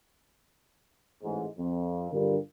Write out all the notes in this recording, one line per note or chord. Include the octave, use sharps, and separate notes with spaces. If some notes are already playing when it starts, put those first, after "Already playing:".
A1 G#2
F2
G2 D3 G3 F4 A#4